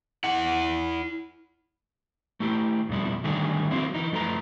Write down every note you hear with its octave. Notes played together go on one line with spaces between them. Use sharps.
E4 F#5
A3 E4 G4
F2 B2 G3 E4
D3 D#3 F#3 G3 A3 G#4
F#3 G#3 A#3 C4 E4
E3 D#4
F#2 F3 A3 B4 A#5